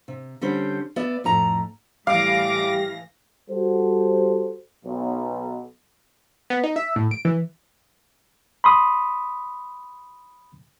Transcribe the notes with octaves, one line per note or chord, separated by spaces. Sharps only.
C3
D3 G3 C#4 C5
B3 D5 E5
F2 A2 A#5
A2 E3 G3 F5 D6 A#6
G3 F#4 A4 C5
B1
B3
D#4
E5
A2
D7
E3
B5 C6 D#6